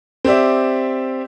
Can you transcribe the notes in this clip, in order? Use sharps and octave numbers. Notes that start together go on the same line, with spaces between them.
C4 G4 D5 E5